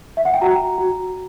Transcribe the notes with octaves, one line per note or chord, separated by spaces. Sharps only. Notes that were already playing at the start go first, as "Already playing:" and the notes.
E5
F#5
G5
F#4 A#5
F#4